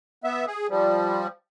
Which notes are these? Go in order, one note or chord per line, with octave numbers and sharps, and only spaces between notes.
B3 E5
G#4
F3 G3